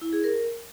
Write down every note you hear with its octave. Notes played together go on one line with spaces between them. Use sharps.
E4
G#4
A#4